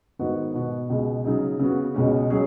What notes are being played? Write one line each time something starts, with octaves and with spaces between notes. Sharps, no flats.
G#2 D#3 B3 F#4
B2 B3 F#4
C#2 B2 G#3
C#3 F#3 D#4 G#4
C#3 B3 F#4
C#2 B2 G#3 C#4
F#3 C#4 G#4